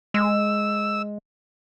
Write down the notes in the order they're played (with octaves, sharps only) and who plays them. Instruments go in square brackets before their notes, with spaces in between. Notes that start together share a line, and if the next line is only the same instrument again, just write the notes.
[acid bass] G#3 [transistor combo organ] E6